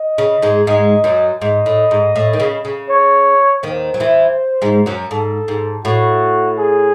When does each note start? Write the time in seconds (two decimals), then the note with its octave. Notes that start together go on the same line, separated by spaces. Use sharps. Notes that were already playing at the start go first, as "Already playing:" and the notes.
Already playing: D#5
0.18 C#3
0.42 G#2 G#3
0.67 G#2 G#3 D#5
1.04 F#2 F#3
1.41 G#2 D#5
1.66 A2
1.91 G#2
2.16 A2
2.33 D#3
2.40 C#3
2.65 C#3
2.89 C#5
3.63 D#2 D#3 C5
3.94 F#3
4.00 E2 E3
4.62 G#2 G#3
4.86 F#2 F#3
5.11 G#2 A4
5.48 G#2
5.85 A2 F#4
6.58 G#4